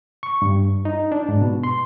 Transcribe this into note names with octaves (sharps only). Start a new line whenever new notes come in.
C#6
G2
D#4
D4
G#2
B2
C6